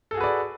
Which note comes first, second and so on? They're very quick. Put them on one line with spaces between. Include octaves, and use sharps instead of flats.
A4 G#4 F#4 B4 D5